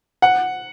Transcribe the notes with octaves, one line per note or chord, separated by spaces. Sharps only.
F#5